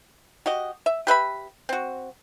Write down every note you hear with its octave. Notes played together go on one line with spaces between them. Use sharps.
F#4 G4 D#5
E5
G4 B4 E5 B5
C4 F#4